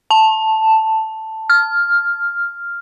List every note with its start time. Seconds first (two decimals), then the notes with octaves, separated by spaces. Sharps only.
0.11 A5
1.50 F6